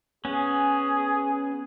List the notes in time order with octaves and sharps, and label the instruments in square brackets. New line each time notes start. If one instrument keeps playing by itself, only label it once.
[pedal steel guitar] B3 C#4 [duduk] G#4